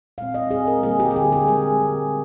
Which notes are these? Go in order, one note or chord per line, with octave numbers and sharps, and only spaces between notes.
A#2 G#3 C4 F5
D#5
A#2 G#3 C4 G#4
A#4
D3 G3 A#3 G#4
G4
G#4
D3 G3 A#3 G4
G#4
D3 G#3 C4 A#4
D3 G#3 C4